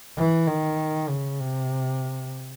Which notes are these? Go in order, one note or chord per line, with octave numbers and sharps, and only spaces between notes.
E3
D#3
C#3
C3